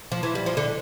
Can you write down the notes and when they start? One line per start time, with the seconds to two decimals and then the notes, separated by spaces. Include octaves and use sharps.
0.12 F3
0.23 E3
0.35 G3
0.46 F3
0.57 D3